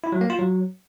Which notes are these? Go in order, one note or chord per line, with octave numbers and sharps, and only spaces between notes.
E4
F#3
A#3
F4
F#3